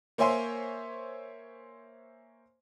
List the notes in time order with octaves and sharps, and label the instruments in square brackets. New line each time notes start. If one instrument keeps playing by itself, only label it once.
[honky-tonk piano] A#3 C5 C#5 E5 G#5 C6